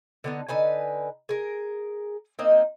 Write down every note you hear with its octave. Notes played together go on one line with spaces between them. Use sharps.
D3 B3 D#4
D3 D#4 B4 G#5
G#4 A#4
A#3 C4 D#4 D#5